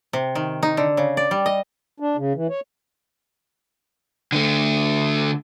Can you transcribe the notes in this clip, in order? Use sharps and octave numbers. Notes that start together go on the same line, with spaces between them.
C3
D#3
D#4
D3
C#3
D5
G3
D#5
D4
C#3
E3
C#5
D3 A3